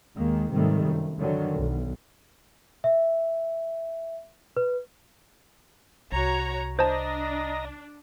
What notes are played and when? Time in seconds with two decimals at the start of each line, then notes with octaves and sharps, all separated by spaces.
0.15 D#2 D#3 G#3 A#3
0.51 G#2 C3 D#3 G3 A3
0.84 F#2
1.19 D3 D#3 F#3
1.55 B1
2.84 E5
4.57 B4
6.12 C2 F#4 C#5 A#5
6.79 D4 C5 D#5 A5 A#5